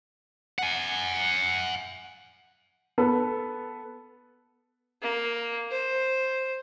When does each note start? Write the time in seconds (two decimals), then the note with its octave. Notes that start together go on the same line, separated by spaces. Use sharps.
0.59 F#5 G#5
2.98 B3 A4 B4
5.02 A#3
5.71 C5